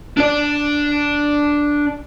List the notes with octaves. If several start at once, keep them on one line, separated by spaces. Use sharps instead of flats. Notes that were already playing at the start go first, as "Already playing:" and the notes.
D4 D5